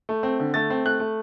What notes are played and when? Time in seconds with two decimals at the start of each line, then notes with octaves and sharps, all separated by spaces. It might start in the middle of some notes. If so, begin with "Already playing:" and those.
0.09 A3
0.23 C4
0.40 D3
0.54 A3 A6
0.70 C4
0.85 A3 F#6
1.00 A3